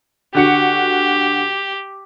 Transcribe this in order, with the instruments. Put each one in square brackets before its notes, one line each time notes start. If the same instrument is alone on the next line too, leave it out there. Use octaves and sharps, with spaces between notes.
[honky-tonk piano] D3 F#4 C#7 [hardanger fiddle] G4